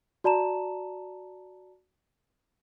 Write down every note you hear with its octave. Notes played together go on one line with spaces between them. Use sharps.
F#4 D5 A5 A#5 E7